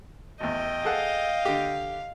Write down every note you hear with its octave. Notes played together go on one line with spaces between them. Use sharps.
A1 E2 D#5 G5
G#4 A4 F5 F#5
D3 G4